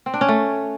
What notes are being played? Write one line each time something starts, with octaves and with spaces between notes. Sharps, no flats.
C4
D4
C#4
A3